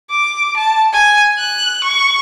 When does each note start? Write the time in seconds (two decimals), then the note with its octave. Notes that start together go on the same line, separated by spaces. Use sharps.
0.10 D6
0.57 A5
0.93 G#5
1.38 F#6
1.84 C#6